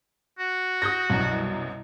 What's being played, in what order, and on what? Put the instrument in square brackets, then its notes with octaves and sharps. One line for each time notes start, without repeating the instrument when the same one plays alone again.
[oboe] F#4
[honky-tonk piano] D#6 G6 A#6
C2 F#2 B2